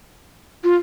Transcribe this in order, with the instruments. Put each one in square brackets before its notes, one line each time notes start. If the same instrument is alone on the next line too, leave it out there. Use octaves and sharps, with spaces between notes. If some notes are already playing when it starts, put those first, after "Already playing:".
[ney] F4